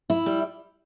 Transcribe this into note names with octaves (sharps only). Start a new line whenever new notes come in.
E4
G3